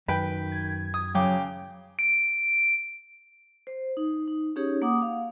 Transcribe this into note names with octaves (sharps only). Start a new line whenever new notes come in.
F#2 D#3 B4 G5
G#6
D#6
C#3 F#3 G5 D6
D7
C5
D#4
D#4
C#4 D#4 G4 G#4 C#5
A#3 F#5 D6 D#6
F5